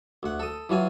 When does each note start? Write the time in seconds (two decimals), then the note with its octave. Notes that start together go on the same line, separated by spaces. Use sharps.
0.23 D2 F#5
0.40 A4 D#6
0.69 E3 F#3 F4 G#5